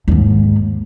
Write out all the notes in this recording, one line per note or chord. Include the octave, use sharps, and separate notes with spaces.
D#2 G#2